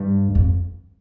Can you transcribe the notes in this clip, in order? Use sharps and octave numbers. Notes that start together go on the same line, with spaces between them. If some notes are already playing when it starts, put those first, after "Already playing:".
Already playing: G2
F2